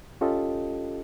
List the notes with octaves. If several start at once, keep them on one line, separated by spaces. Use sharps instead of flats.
C#4 F4 G4 A4 D#5